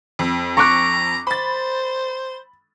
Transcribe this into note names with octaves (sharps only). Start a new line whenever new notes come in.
F2
A#5 C#6 D6 F#6
C5 B5 A6